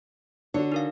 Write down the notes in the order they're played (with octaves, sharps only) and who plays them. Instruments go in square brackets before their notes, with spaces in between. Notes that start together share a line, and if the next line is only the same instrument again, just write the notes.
[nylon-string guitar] D3 C#5 [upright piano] D4 F#4
[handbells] D#4 A#4 F5